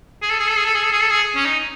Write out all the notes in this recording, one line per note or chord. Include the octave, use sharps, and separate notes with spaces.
G#4
A4
G#4
A4
G#4
A4
G#4
A4
G#4
A4
G#4
C#4
D#4